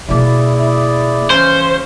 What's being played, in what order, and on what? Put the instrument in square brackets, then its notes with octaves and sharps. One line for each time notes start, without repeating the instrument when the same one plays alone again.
[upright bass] B2 A#3 [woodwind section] E4 G#4 D5
[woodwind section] C#3 E3 C#4 [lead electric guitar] C5